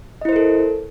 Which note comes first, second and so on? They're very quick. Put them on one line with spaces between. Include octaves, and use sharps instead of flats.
D#5 E4 C5 A#4 A4